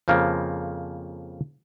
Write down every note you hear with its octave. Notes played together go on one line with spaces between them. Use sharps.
F2 C#3 F3 A#3